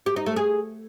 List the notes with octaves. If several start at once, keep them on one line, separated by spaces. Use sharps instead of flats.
G4
D#4
A3
G#4